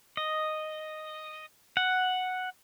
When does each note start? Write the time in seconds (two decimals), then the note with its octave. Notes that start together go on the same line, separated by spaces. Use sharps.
0.17 D#5
1.77 F#5